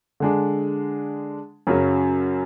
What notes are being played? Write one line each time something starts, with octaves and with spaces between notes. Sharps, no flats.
D3 G#3 D4
F#2 C#3 F#3 C#4